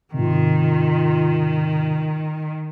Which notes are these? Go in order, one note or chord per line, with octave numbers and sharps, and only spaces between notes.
G#2 C3 D#3 F4